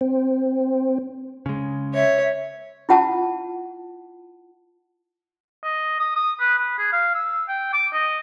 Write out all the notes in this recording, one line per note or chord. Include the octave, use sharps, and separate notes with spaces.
C4
C#3 G#3
C#5 E5
E4 F4 F#5 A5
D#5
D#6
D#6
B4
B4
G#4
F5
E6
G5
D6
D#5